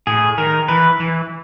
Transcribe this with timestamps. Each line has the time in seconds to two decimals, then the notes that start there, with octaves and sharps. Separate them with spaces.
0.07 A2 G#4
0.38 D#3 A#4
0.68 E3 B4
1.00 E3